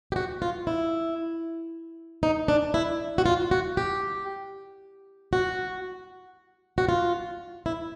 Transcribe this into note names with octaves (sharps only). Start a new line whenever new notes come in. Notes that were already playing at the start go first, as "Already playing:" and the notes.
G4
F#4
F4
E4
D#4
D4
E4
F#4
F4
F#4
G4
F#4
F#4
F4
E4